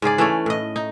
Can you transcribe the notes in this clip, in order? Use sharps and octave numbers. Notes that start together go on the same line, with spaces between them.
G#2 C#3 G#4 D5
E3 A3 C#4 D5
A2 D#5
D#4